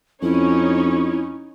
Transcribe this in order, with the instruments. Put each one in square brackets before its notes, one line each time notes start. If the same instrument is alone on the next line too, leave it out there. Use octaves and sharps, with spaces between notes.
[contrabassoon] F2 [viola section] C#4 D#4 C#5 [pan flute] E4